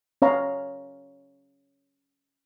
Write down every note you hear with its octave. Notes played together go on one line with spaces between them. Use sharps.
C#4 C#5 F5 A#5